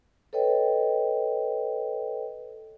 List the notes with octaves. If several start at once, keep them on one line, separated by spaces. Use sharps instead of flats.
A4 B4 C#5 D#5 G5